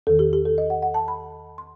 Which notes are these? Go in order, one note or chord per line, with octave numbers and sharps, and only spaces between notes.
E2 D#3 A4
G4
G4
A4
D#5
F#5
F#5
A5
B5
C6